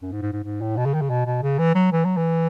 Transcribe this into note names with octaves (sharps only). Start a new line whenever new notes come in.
F#2
G#2
G#2
G#2
G#2
A2
B2
C#3
D#3
C#3
B2
B2
C#3
E3
F#3
E3
F#3
E3